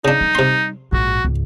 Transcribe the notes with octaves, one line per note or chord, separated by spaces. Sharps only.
C#3 D4 D#4
G3
C3 C6
A#1 G#2 F#4
C#2 G#2